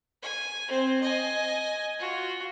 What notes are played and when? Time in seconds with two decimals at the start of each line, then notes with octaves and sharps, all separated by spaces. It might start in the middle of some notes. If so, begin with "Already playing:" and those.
0.22 G#5
0.68 C4 C5
1.00 D#5 G#5
1.99 F4 F#4